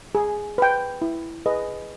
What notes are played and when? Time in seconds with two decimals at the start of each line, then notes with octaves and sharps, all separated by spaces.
0.15 G#4
0.58 B4 G5
1.02 E4
1.46 G#4 B4 D#5